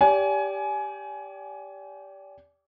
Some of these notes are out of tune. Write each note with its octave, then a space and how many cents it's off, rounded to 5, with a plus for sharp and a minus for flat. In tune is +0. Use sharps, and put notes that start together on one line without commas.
G4 +0 D5 -35 G#5 +20